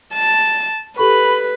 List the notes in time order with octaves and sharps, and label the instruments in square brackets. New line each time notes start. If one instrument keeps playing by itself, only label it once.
[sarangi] A5
[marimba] G4 A4 C#6 [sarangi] B4 [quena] B5